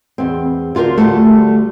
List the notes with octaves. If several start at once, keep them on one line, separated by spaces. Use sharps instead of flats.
E2 C4
D2 F4 F#4 A#4 C5
D2 G3 A3